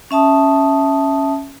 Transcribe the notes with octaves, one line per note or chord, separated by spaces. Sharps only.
C#4 E5 A5 D#6